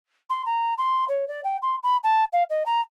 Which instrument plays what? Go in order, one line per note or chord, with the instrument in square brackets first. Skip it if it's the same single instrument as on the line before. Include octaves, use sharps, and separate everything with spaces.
[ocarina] C6
A#5
C6
C#5
D5
G5
C6
B5
A5
F5
D#5
A#5